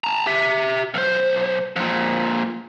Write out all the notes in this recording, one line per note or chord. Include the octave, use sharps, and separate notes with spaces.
A5 A#5
G4 E5
B1 C5
F2 A#2